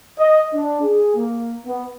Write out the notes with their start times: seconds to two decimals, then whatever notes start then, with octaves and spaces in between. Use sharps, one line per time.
0.18 D#5
0.54 D4
0.83 G#4
1.16 A#3
1.66 B3